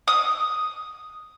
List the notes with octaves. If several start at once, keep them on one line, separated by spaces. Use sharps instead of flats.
D#6